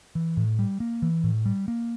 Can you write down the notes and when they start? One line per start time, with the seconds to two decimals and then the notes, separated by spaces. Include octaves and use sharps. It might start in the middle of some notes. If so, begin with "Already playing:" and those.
0.15 E3
0.37 A2
0.59 G3
0.80 A#3
1.02 E3
1.24 A2
1.46 G3
1.68 A#3